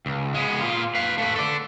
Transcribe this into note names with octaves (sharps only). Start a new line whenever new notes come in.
C#2
G#3 B3
A#2 F4
B4 F5
A3 B4
A4 D5